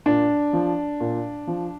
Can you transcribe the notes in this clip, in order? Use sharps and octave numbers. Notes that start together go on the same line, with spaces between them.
A#2 D4
F3
A#2
F3